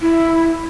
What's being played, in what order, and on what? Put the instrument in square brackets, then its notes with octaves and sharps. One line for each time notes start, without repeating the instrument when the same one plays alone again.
[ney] E4